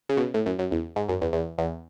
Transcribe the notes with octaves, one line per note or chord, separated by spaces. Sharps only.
C#3
B2
A2
F#2
F#2
E2
G#2
F#2
E2
E2
E2